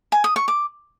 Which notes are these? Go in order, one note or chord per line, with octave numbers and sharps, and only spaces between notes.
G#5
D#6
C#6
D6